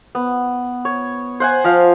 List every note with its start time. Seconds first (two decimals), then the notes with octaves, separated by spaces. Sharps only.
0.15 B3
0.85 C#5
1.40 C5 F#5 G#5
1.64 F3 F5